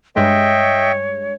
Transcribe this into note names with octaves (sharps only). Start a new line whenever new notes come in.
G2 G#3 C#5 D#5 E5 G5